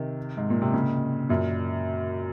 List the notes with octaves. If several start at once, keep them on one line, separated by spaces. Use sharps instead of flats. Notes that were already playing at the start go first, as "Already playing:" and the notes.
Already playing: C3 D#3
G#2
A#2
C3
A#2 C#3
F#2 A#2